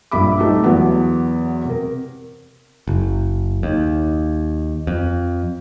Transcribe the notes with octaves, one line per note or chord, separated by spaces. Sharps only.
A#1 G2 E5 B5 D6
G3 A3 C4 D#4
E2 F#3 B3
C3 A#4
F#1
D#2
F2